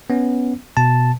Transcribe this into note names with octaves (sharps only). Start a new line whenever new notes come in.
B3 C#4
B2 A5